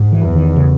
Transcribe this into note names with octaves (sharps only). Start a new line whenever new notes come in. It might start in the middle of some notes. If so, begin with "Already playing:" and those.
Already playing: G#2
E3
E2
D#3
C#3